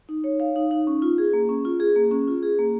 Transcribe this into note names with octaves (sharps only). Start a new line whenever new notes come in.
D#4
C#5
F5
D#4
D#4
C#4
F4
G#4
A#3
C#4
F4
G#4
A#3
C#4
F4
G#4
A#3